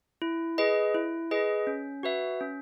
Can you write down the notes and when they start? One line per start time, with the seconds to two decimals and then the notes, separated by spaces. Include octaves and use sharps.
0.22 E4
0.58 G#4 B4 D#5
0.95 E4
1.31 G#4 B4 D#5
1.67 C#4
2.03 F#4 B4 E5
2.40 C#4